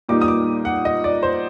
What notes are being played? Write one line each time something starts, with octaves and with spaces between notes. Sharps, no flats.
A#2 G3 A#3 D#4 D6
D#6
D6
F#5
D#5
D5
C5